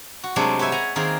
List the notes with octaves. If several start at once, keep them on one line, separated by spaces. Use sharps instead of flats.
F#4
C3 F#3 G#3 A3 D4
G4 B4 C#5 E5 G#5
F#5 G#5 A#5
D#3 A#3 C4 G#4